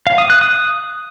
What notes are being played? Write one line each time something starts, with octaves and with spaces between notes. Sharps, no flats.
F5
D#6
F#6
D#6